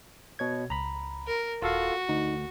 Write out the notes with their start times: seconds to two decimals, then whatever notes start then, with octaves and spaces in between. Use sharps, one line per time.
0.39 B2 C#5 G#6
0.70 C#2 A#5 B5
1.27 A#4
1.62 D#1 F4 F#4 A4 F5
2.09 D2 D#4